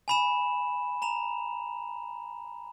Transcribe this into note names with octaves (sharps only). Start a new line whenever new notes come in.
G#5 B5 E7
A#5 E7 F7